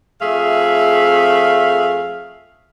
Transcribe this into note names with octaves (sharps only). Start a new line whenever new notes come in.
F2 A3 G#4 E5 F5